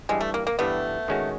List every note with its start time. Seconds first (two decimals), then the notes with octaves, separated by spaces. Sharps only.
0.09 G2 E3 G3 G#3
0.21 A3
0.34 A#3
0.47 A#3
0.59 G2 E3 G3 A3 B3
1.08 D#3 G#3 C#4 F#4